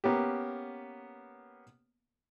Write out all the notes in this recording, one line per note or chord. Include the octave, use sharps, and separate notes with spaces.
A#3 B3 C#4 G4